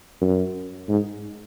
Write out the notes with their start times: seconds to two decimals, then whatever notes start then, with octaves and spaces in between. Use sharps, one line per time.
0.21 F#2
0.88 G#2